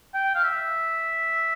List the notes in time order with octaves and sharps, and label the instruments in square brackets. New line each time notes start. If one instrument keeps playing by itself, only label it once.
[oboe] G5
F5
E5